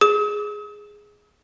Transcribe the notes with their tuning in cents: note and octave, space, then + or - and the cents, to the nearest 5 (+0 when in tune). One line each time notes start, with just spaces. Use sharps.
G#4 +0 D#6 +45